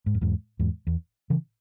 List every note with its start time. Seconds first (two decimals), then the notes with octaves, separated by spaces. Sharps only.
0.06 G#2
0.15 F#2
0.21 E2 G#2
0.59 E2 G#2
0.87 E2
1.30 C#3 E3